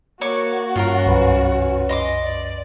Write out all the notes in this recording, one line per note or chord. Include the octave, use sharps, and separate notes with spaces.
A#3 F#4 C#5 C#6 D6
G2 C#4 F4 G#4 A#4
C2 F#2 B4
D#5 C6 D6
D5